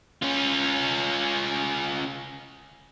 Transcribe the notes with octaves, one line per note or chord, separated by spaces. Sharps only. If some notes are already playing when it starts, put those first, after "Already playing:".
C#4 F4